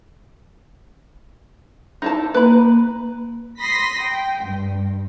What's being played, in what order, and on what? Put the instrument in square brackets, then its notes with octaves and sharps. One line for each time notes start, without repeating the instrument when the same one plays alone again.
[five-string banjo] D#4 E4 A5
[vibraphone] A#3 [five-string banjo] B4 B5
[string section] B5 C6 D#6 A#6 B6
G5
G2